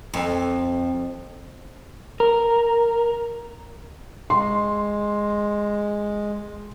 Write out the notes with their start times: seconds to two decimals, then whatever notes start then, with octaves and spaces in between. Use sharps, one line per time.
0.14 F2
2.20 A#4
4.30 G#3 C6